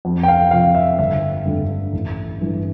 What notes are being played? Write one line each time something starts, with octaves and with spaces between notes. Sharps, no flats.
F2
G5
F5
C3 F3 F5
E5
G1 E5
G2 D3 A3 D4
A1
G2 E3 A3